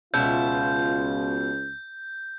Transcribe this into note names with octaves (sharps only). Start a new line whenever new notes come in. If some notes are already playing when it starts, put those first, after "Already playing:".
C#2 B2 F4 E5 G6